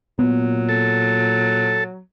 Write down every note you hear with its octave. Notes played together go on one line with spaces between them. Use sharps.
A#2 F#3 B3
A4